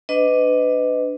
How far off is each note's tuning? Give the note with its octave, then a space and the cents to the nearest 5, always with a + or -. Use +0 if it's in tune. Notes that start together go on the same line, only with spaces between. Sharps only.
D4 +0 B4 +30 D#5 +5